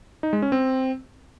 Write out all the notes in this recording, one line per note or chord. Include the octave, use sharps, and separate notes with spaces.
D#4
G#3
C#4
C4